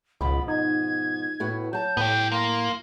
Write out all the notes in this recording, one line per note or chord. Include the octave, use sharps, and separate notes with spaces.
C#2 G#2 B2 F3 B5
D#4 G#6
A2 B3 F#4
F#3 A5 G6
A2 B3 G4
A#3 C6